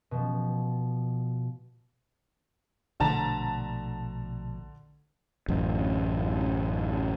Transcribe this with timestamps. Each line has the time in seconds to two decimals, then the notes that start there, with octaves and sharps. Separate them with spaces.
0.11 B2 F3
3.00 A#1 B2 D3 A3 A5 A#5
5.48 A1 F#2